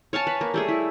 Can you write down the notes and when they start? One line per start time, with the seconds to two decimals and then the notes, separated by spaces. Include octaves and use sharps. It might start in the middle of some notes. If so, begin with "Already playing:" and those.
0.13 C#5 F5 G#5 A5
0.27 B4
0.41 A#3
0.54 G3 A3 G#4
0.68 E4